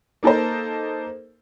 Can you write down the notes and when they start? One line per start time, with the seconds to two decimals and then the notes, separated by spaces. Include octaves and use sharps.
0.23 A#3 D#4 A4 A#4 C5